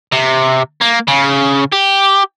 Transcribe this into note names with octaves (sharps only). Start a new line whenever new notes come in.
C3
A#3
C#3
G4